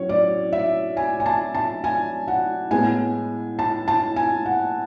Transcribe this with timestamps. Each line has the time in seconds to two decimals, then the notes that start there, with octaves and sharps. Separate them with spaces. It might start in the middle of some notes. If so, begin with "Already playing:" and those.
Already playing: A2 F#3 C#4 C#5
0.09 D5
0.52 E5
0.97 G#5
1.20 G#5
1.26 A5
1.54 A5
1.84 G#5
2.28 F#5
2.71 A2 G#3 B3 G#5
3.59 A5
3.88 A5
4.16 G#5
4.46 F#5